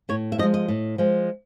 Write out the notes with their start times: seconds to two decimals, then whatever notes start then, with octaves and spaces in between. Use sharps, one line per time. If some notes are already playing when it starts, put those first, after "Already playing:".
0.09 A2 C#5
0.32 E5
0.38 F3 D#5
0.43 G#3
0.54 D#5
0.68 A2
0.98 F3 G#3